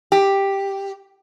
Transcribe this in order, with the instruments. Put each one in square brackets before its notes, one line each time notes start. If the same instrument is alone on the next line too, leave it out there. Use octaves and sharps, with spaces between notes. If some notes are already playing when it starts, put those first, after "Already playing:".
[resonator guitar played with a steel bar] G4